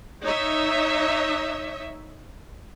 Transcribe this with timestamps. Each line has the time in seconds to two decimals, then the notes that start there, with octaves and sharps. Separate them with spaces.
0.23 D#4 C#5 D#5 E5